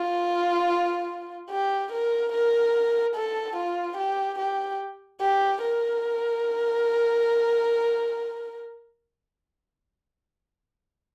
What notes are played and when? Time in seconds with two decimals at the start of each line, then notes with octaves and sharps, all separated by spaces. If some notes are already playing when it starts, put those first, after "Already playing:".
Already playing: F4
1.50 G4
1.92 A#4
2.32 A#4
3.15 A4
3.56 F4
3.97 G4
4.38 G4
5.21 G4
5.62 A#4